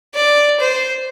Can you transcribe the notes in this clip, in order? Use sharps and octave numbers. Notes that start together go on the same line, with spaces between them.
D5
C5